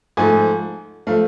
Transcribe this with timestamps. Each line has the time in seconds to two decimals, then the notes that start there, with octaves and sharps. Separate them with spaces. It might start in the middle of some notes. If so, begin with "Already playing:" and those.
0.17 G#2 F3 A3 G#5
1.07 F3 A3 F5